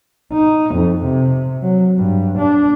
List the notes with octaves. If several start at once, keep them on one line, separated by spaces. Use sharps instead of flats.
D#4
F2
C3
F#3
G2
D4